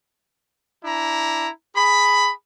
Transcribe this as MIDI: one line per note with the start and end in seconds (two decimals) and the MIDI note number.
0.84 1.49 62
0.84 1.49 64
0.84 1.49 82
1.76 2.31 68
1.76 2.31 83